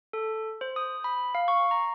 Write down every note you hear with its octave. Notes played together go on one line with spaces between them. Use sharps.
A4
C5
D#6
B5
F5
C#6
A#5